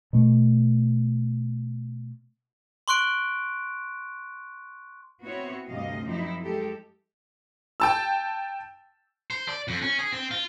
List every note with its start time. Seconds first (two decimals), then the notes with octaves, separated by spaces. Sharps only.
0.13 B2 A3
2.88 C6 C#6 F#6 D7
5.24 B3 C4 E4 F#4 C#5
5.68 D2 G2 C3 D#5 F5
6.04 F#2 F3 C4 D#4 E4
6.44 G#3 G4 A4
7.80 G5 A5 E6
9.31 C5
9.48 D5
9.68 F2
9.82 C#4
9.99 G#4
10.13 C4
10.31 F4